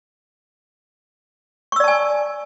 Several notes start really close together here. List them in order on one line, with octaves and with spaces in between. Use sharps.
C#6 E6 D5 A5 G#5